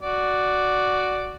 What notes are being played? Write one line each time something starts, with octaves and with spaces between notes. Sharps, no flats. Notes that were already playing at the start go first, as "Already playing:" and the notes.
F#4 D5